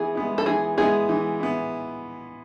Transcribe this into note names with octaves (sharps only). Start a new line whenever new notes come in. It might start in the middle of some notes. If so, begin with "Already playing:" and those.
Already playing: E3 B3 E4 G#4
G#3 B3 E4
A4
E3 G#4
G#3 B3 E4 G#4
E3
B3 E4